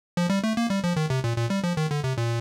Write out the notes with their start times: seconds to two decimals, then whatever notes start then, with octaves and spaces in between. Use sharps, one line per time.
0.17 F3
0.30 G3
0.44 A3
0.57 A#3
0.70 G3
0.84 F3
0.96 D#3
1.10 C3
1.24 A#2
1.37 A#2
1.50 G3
1.64 F3
1.77 D#3
1.91 D3
2.04 C3
2.18 A#2